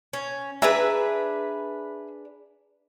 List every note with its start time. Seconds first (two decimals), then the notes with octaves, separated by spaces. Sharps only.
0.13 C#4
0.62 D4 G#4 B4 E5 G#5 A#5